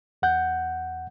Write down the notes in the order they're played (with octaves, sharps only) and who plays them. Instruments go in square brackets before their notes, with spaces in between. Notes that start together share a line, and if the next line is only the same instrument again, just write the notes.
[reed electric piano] E2 F#5 G6